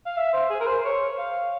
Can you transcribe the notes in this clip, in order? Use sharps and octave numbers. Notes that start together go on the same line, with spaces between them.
F5
E5
C5
G#4
A#4
C5
C#5
F5